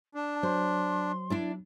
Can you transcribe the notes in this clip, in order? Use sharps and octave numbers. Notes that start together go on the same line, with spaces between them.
D4 A5
F#3 C5 C6
D4 E4 D5